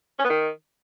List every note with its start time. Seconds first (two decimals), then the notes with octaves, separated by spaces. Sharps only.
0.19 C#4
0.24 B3
0.29 D#3